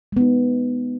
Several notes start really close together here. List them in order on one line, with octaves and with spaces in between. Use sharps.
G#3 B3 D#4